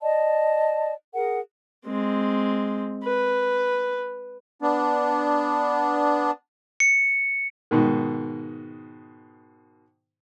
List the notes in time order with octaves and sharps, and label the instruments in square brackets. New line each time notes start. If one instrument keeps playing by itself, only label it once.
[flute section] D5 D#5 A5
G#4 A#4 F#5
[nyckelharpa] G#3 C4
B4
[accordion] B3 D4
[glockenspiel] C#7
[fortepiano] G#2 B2 D#3